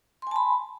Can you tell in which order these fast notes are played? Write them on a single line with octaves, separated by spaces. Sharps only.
C6 G#5 A5 B5